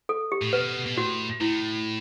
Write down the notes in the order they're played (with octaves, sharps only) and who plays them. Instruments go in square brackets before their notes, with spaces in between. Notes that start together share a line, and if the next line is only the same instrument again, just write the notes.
[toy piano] A4
G4
[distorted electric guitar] A2
[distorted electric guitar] B2 [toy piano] B4
[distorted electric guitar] B2
[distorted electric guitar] A2 [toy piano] F#4
[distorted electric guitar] A2 [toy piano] E4